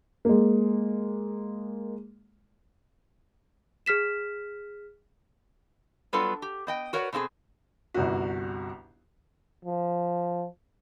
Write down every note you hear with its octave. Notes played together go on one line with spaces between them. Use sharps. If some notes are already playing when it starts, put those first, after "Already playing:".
G#3 A#3
G#4 F6 B6 E7
F#3 G3 B3 D4 F4 A4
G4
B3 D#5 G5
F#4 A#4 B4 C#5 D5 F#5
B2 C4 E4 G#4 A4
G1 C2 F#4
F3